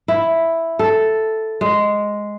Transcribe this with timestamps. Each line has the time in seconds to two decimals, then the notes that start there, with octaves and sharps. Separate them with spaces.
0.08 E4
0.79 A4
1.61 G#3